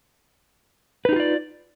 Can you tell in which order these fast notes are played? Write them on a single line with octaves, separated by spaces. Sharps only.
B4 D#4 G4 F4 D5